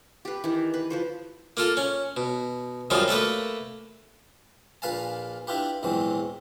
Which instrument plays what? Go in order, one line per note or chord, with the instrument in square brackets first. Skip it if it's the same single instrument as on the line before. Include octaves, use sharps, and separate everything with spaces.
[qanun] G4 B4
D#3 E3
B4
F3 B4 C5
[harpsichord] A#3 F4 A4
C#4
B2
F#2 D#3 F3 G3 D#4 F4
A3 A#3 A4 B4
A#1 A#2 B4 F5 G#5 A5
D4 E4 F4 G4 B4
A#1 E2 G#2 E3 F#3 C4